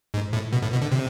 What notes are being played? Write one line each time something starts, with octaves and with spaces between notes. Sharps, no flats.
G#2
A2
B2
A2
B2
D3
C3